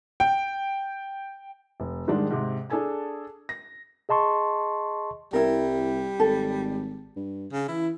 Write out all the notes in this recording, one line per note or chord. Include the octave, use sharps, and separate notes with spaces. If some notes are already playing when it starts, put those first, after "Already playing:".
G5
F1
G#2 D#3 G3 G#3 D4
G#2 C3
D4 G#4 A4 G#5 A5
A#6
G#4 D#5 A5 C6 C#6
C2 G3 E4 A#4
G#1 A4
G2
C#3
E3 E4